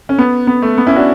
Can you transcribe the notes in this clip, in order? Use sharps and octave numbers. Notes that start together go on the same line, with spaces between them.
C#4
B3
B3
A3
B3
C#4 E4
D4 F#4